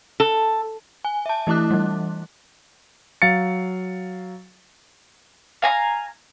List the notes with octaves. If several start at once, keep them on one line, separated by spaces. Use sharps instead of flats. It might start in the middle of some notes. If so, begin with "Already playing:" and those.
A4
G#5
E5 A5
E3 A3 E4 D6 F#6
E3 G3
F#3 F5 A6 C#7
F5 G#5 A#5